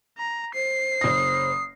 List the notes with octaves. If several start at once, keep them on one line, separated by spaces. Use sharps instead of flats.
A#5
C5 C7
F#1 D#6 A#6